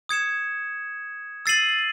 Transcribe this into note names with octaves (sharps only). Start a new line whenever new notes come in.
D#6 G#6 C#7 E7
E6 A6 C7 D#7 F#7